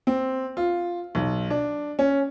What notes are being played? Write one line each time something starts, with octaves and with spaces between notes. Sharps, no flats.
C4
F4
B1
D4
C#4